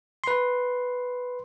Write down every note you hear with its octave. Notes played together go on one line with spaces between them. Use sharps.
B4 C6